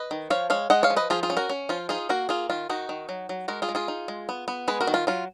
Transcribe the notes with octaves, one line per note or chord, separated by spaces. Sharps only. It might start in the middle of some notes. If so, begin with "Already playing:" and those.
Already playing: B4 D#5
D#3
F3 C#5 F5
G#3 C#5 F5
G#3 D#5 F#5
C#5 F5
F3
B4 D#5
F3 F4 G#4
F4 G#4
C#4
F#4 A#4
C#4
F3 F4
D#4 F4 G#4
A#3 F#4 A#4
A#3 F4 G#4
D#3 F4
D#3 D#4 F#4
D#3
F#3
F#3
G#3 F#4 A#4
F4 G#4
G#3
F4 G#4
D#4
G#3
B3
B3
G#3 G#4 B4
F#4 A#4
D#3
F4
F#3 F4